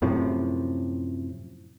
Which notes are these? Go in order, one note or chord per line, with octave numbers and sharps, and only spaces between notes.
F#2 A2 C3 F3